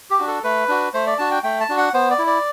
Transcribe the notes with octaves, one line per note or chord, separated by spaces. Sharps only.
G4
D4 F#4
A4
A3 B4
D4 F#4
A3 C5
D5
D4 F#4 A5
G5
A3 G5
A5
D4 F#4
F#5
B3 C5
D5
E4
D5